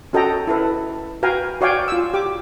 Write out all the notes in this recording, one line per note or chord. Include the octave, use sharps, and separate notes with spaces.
C#4 F#4 A4 D#5 G5 A#5
E4 A4 B4
F#4 B4 F5 G5 G#5 A#5
F#4 C#5 D5 F5 G5 G#5
F4 E6
G4 D6